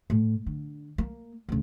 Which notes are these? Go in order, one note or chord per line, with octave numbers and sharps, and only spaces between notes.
A2
D3
A#3
D2 C#3